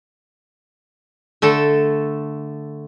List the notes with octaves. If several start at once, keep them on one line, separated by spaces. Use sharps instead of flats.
D3 A3 A4